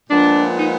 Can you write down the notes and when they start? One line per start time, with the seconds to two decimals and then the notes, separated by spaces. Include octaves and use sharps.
0.08 A#2 F3 G#3 B3 D4
0.58 D#4